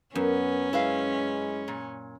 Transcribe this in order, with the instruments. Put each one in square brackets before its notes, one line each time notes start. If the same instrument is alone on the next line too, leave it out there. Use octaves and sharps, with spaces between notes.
[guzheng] F#2 [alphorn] B3 [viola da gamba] C#4
[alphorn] G#3 [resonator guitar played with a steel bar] E4 B4 F5
[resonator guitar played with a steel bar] A#2